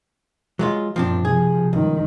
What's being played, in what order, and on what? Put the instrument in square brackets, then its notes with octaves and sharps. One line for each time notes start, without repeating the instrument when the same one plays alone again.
[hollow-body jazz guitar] F#3 G#3 F4
[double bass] F#2 A#2 [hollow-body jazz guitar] F3 C4 D4
[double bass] C3 F3 [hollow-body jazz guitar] G#4
[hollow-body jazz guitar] C#2 [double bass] G2 D#3